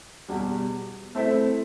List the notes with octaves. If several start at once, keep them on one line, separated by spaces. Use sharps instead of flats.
E2 B2 G3
A3 C4 E4 A4 E5